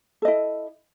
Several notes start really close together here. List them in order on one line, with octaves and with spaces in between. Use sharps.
A4 D#5 E4